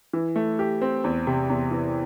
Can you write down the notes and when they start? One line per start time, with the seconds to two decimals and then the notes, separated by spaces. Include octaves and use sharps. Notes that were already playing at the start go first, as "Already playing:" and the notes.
0.13 E3
0.36 A3
0.59 G4
0.82 C4
1.04 E2
1.27 C3
1.50 E2
1.71 E3